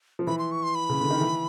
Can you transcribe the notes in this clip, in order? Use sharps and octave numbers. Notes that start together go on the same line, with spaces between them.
F3
E3 B5
C6
C#6
C6
B5
C#3
D3
D#3
E3